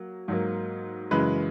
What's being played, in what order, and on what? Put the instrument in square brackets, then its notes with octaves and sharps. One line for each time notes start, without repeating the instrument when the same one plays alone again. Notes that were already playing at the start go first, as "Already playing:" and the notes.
Already playing: [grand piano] F#3 A#3
G#2 F#3 A#3
F#2 C#3 E3 G#3 B4